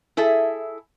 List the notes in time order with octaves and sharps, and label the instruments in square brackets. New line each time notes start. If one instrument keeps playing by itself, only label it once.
[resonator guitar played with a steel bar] E4 G#4 A4 E5